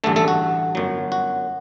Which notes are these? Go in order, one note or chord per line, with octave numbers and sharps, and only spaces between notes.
A1 G2 D3 A3 A4
A3 A4
F#4
G1 F#2 F#3
F#4